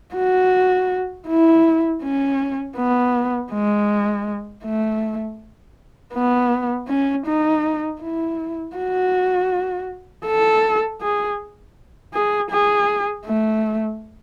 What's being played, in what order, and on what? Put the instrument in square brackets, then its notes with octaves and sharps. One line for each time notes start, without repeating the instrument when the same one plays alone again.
[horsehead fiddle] F#4
E4
C#4
B3
G#3
A3
B3
C#4
D#4
E4
F#4
A4
G#4
G#4
G#4
A3